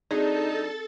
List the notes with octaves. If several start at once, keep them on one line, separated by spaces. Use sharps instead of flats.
F#3 C4 D4 D#4 G#4 A4 A5